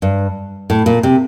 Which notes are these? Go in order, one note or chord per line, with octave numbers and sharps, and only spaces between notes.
G2
A2
A#2
C3